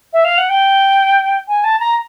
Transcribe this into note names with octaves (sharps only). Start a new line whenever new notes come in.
E5
F5
F#5
G5
G#5
A5
A#5